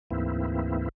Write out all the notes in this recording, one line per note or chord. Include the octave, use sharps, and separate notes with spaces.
D2 G#2 E3 A#3 C4 E4